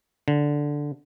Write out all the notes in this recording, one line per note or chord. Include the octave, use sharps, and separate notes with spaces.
D3